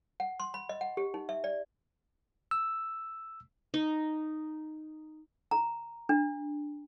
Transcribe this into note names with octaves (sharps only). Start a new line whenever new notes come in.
F#5
C6
B5
D#5
F#5
G4
D#4
E5
D5
E6
D#4
A#5
D4